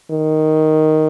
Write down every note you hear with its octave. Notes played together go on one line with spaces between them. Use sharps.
D#3